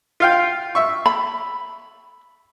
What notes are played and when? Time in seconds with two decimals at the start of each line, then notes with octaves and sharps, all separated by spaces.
0.20 F4 F5 G5
0.75 E5 C#6
1.06 B5